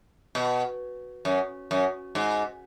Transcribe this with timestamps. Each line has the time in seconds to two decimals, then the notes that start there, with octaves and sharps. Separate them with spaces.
0.35 B2
1.25 F#2
1.71 F#2
2.15 G#2